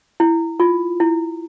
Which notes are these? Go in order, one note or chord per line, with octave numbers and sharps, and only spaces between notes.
E4
F4
E4